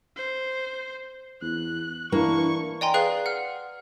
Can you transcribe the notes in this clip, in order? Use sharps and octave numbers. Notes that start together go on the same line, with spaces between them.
C5
E2 F#6
E3 A#3 D4 C#6
D5 D#5 G5 G#5 A#5 C6
G#4 B4 D5 F5 F#6
F#5 F6